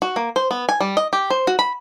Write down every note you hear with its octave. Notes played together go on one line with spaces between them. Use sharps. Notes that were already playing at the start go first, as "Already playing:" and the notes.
F#4
A#3
C5
B3
G#5
G3
D#5
G4
C5
F#4
B5